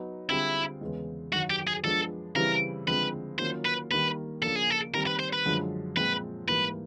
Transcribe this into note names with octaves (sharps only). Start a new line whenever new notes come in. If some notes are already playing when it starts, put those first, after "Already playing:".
Already playing: F#3 B3 D#4
D3 G3 C4 E4 F4 G#4
E2 C#3 E3 G#3
F#2 D#3 F#3 F#4
G4
G#4
F3 G#3 B3 D4 A4
C#3 E3 G3 C4 E4 A#4
D3 F3 G#3 C4 B4
D#3 F#3 A#3 C#4 F4 C5
B4
D#3 G3 A#3 B4
C#3 F3 A#3 D4 A4
G#4
A4
D#3 G3 C4 A#4
B4
C5
B4
F#2 D3 F3 G#3
A#2 F3 G#3 C4 B4
G#2 E3 G3 A#3 B4